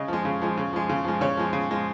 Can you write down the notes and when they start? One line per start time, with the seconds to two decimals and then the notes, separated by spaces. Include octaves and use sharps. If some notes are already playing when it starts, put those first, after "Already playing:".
Already playing: C#3 D#5
0.08 F3 G#3
0.25 C#3
0.41 F3 G#3
0.57 C#3
0.73 F3 G#3
0.89 C#3
1.05 F3 G#3
1.21 C#3 C#5
1.37 F3 G#3
1.53 C#3
1.70 F3 G#3